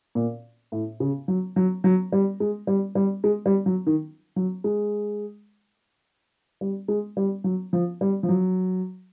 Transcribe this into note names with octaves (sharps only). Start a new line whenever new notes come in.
A#2
A2
C#3
F#3
F#3
F#3
G3
G#3
G3
G3
G#3
G3
F#3
D#3
F#3
G#3
G3
G#3
G3
F#3
F3
G3
F3
F#3